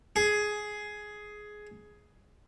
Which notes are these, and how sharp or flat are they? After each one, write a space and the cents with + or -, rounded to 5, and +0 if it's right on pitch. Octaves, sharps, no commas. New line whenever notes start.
G#4 +10